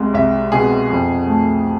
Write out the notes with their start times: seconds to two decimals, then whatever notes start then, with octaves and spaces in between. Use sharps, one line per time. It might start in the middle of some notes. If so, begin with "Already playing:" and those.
Already playing: C2 G#3
0.14 C2 E5
0.52 B2 G#4
0.90 F2
1.27 A3